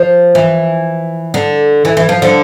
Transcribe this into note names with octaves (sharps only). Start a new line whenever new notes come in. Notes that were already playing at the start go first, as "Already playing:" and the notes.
Already playing: F3
E3
D3
E3
E3
F3
D3